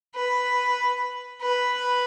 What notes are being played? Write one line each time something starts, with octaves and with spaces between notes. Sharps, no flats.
B4
B4